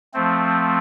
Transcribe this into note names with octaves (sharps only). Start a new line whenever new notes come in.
F3 A3 C4